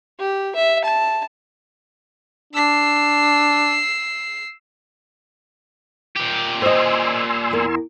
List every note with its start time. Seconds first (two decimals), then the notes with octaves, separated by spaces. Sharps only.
0.19 G4
0.55 E5
0.84 A5
2.53 D4 E6 C7
6.16 A#2 G4
6.62 C5 D#5 G#5 C6 E6
7.51 E2 A#4